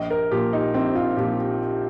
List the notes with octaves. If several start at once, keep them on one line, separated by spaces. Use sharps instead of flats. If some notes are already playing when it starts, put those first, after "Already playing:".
Already playing: A#1 D#5
A#4
A#2 F3 G4
D#4
A#1 C4
F4
A#2 F3 G4